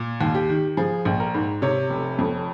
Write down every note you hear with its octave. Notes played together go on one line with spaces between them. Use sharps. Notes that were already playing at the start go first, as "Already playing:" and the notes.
Already playing: A#2
D#2
G4
D#3
F3 G#4
A#1
A#4
G#2
C3 C#5
F1
F2